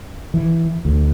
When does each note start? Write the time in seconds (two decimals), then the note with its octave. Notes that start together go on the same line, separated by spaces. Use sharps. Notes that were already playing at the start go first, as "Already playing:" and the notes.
0.34 E3
0.85 D2